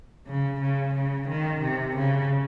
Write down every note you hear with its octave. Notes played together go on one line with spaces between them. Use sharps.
C#3
C#3
C#3
D#3
C3
C#3